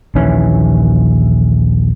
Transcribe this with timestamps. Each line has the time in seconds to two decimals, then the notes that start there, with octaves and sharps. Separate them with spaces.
0.15 A#1 D#2 E3 C#4